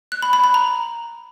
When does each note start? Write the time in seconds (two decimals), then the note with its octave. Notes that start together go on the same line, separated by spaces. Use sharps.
0.12 F#6
0.22 B5
0.33 B5
0.44 B5
0.54 A#5